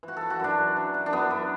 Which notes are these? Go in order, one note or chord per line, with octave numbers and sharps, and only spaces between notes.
E3
F#4
E3 A4
F#4
F#2 D4
F#2
E3
E3
D4
F#2 B3
F#2